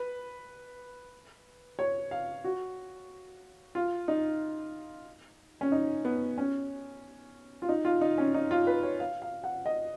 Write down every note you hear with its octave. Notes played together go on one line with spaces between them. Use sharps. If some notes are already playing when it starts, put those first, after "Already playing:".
Already playing: B4
C#5
F5
F#4
F4
D#4
C#4
D#4
B3
C#4
F4
D#4
F4
D#4
C#4
D#4
F4
B4
C#5
F5
F5
F#5
D#5